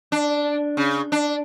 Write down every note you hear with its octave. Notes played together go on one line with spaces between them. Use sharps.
D4
C#3
D4